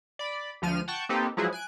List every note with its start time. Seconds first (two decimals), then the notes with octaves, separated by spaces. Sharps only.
0.19 D5 B5
0.62 D2 F3 F6 D#7
0.88 F#5 G5 A5 C#6 G6
1.09 A#3 C4 D#4 G4 A4 B4
1.37 F3 F#3 G#3 E4 G#4 B4
1.53 G#5 F#6 D7